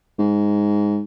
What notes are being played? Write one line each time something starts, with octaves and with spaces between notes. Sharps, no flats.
G#2